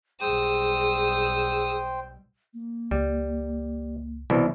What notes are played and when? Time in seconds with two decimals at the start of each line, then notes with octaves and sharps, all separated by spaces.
0.21 B1 G3 G#4 C5 G5 D#6 E6
2.54 A#3
2.91 C#2 G3
4.30 C2 B2 E3